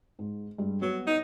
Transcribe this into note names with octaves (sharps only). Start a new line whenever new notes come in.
G#2
G2 G3 G#3
F#3 B3
D#4